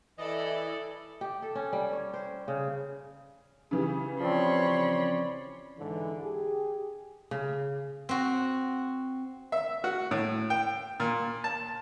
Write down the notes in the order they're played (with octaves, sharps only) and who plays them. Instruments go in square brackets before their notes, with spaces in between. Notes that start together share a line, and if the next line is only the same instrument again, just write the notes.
[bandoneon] E3 D#5 [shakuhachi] E4 [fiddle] A4 D5
[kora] G4
A4
C#4
G3
C#5
C5
C#3
[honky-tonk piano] C#3 E3 G4 [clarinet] G#4
[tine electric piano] F3 C4 [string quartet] C#5 B5 C6 [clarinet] D5
[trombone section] G#2 D3 E3
G4 G#4
[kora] C#3
[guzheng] C4 F#4
[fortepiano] E5
F#4
A2
G5
A#2
A5